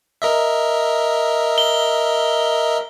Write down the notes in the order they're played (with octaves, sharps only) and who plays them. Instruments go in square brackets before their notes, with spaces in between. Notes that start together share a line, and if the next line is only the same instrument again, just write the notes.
[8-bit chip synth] A#4 D#5 E5
[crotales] G7